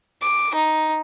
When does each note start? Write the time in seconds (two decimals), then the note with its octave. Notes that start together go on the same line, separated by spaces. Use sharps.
0.22 D6
0.55 D#4